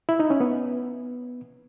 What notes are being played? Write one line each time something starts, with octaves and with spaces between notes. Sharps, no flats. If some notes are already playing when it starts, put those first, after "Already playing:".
E4
D#4
C#4
B3